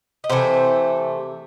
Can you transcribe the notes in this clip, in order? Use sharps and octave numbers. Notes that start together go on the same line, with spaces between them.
D#5
C3 E3 A3 C5